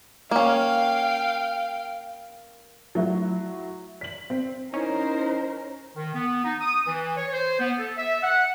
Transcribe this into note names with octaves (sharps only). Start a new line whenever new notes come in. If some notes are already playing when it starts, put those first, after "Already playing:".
A#3 C#4 F5 G5
F#3 A3 E4 F#4
B6 F#7
C4
C#4 D#4 E4 A#4 C5
D#3
B3
D#4
D#6
E3
C#5
C5
B3
A4
E5
F#5